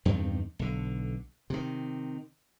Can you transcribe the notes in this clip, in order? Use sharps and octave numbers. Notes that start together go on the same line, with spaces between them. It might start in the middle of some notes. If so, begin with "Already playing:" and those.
E2 G2 C3 D#3
B1 D3
C3 D#3